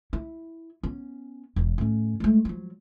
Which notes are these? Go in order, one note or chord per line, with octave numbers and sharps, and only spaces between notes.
E4
B3 C#4
E1 E2
A2 C#4
G#3 A3
F3 F#3